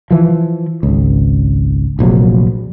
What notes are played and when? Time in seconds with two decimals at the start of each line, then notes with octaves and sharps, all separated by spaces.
0.11 E3 F3
0.83 G#1 C#2
1.99 F1 A#1 F2 F#3